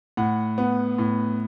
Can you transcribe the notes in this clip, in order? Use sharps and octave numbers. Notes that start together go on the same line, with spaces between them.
A2 F#5
B3
A2